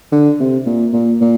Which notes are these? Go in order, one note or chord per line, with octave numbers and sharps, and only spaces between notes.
D3
C3
A#2
A#2
A#2